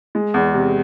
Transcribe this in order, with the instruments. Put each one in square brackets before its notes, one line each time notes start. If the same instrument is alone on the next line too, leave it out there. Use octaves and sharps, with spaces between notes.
[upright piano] G#3
E2
C3